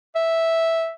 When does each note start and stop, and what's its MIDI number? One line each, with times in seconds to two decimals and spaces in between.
0.15 0.91 76